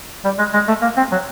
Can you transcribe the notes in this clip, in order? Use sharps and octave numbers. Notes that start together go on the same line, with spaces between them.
G3
G#3
G#3
A3
A#3
C4
F#3